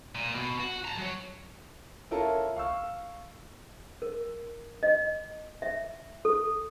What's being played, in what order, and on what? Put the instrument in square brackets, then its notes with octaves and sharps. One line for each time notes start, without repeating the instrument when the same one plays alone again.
[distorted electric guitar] A#2
B2
F#4
A5 A#5
F#3 C#5
[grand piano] C#4 E4 F4 A4 A#4
F5 C#6 E6
[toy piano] A#4
D#5
E5
A4